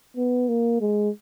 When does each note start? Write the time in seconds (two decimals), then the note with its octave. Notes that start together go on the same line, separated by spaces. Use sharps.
0.17 B3
0.49 A#3
0.81 G#3